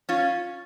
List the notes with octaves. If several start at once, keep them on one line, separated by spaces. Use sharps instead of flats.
C#4 F4